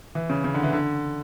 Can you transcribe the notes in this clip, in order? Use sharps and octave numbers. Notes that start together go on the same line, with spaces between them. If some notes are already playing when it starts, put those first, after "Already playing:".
E3
C#3
C#3
D3
E3
D3